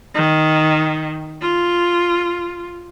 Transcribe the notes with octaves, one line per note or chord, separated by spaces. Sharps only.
D#3
F4